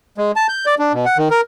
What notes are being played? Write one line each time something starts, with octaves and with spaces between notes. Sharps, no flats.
G#3
A5
G6
D5
D4
B2
F#5
D#3
A#4